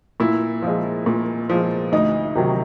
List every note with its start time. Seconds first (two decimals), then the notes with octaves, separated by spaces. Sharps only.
0.20 A#2 E4
0.62 F3 G#3
1.06 A#2
1.50 F3 G#3
1.92 D2 D#4
2.35 C3 D#3 F#3